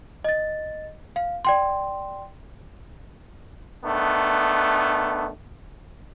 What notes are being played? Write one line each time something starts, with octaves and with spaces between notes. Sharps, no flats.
D#5 A6
F5
D5 G5 C6
D#3 A3 B3 D4